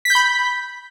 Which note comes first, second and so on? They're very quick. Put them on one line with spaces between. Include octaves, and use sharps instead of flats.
B6 G6 B5